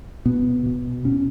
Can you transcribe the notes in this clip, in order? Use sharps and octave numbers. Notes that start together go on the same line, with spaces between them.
B2 B3
B2
B2 C#4